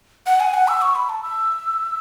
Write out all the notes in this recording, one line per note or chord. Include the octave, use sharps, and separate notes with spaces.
F#5
G#5
F#5
E6
C#6
B5
A5
E6